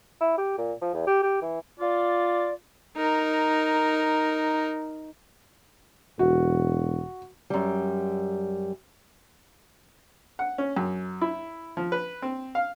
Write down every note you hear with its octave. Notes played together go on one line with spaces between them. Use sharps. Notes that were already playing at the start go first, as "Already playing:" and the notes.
E4
G4
A#2
F3
E2
G4
G4
E3
F4 D5
D#4 A#4
E1 F#4
F#2 G3
F#5
C#4
F#2
E4
F3
B4
C4
F5